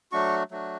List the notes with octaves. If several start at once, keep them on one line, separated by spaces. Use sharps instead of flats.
F#3 A3 D4 F#4 C#6
F#3 A3 D4 F#4